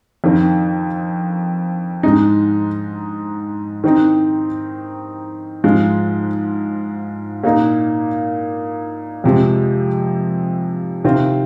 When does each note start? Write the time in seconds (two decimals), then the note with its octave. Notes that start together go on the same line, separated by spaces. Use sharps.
0.24 F2 D#3 C4
2.03 G#2 G#3 D#4
3.84 D#3 C4 D#4
5.64 G#2 F3 G#3 F4
7.44 A#2 A#3 D#4
9.24 F2 C3 F3 G#3
11.04 C3 D#3 C4 F4